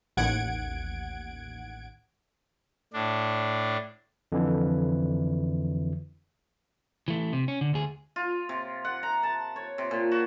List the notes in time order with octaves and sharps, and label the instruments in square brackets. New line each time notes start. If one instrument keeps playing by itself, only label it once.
[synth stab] A1 D#2 F#5 G#6 D7
[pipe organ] A2 D4
[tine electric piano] F2 D3 E3
[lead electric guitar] E3 A3
C3
C#4
D3
D2 G#4
[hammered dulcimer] F4
C3
F#5
A#5
A5
C#5
C3
A#2
F#4